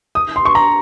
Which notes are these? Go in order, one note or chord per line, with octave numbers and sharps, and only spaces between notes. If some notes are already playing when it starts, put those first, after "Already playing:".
D#6
C6
C#6
A#5